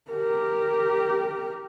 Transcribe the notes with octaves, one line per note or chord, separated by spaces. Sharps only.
G4 A#4